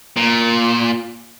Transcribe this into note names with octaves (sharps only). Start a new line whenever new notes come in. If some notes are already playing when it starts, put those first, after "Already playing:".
A#2